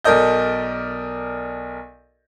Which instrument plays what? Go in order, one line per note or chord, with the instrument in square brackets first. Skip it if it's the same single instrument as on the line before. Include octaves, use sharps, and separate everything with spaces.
[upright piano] B1 A4 A#4 D5 D#5 G6